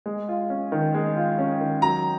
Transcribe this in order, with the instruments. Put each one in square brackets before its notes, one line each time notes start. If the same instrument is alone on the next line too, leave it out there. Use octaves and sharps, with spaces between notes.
[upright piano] G#3
F4
C#4
D#3
G#3
F4
C#4
D#3
[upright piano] F#3 [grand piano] A#5